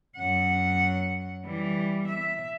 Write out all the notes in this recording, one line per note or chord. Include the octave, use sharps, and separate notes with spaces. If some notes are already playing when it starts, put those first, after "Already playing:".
F#2 F#5
E3 G3
E5